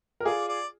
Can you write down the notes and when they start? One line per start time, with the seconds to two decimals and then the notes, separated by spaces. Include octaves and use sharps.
0.20 A#4
0.25 F4 G#4 D5
0.48 D5